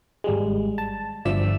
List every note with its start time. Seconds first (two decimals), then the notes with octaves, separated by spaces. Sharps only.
0.24 G#1 G3 G#3
0.78 A5
1.25 G1 G2 F3 D5 E5 E6